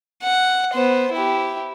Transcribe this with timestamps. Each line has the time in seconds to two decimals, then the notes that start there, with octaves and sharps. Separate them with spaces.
0.23 F#5
0.73 B3 C5
1.12 E4 G4